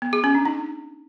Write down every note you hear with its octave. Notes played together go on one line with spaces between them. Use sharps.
B3
G#4
C#4
D4
D#4